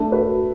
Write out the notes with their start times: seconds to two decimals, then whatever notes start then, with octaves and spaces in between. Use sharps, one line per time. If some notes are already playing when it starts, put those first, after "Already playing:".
Already playing: A3 D4
0.12 F#4 B4